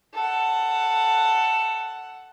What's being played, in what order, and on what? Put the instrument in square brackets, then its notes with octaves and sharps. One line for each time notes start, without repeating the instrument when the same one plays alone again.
[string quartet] A4 F#5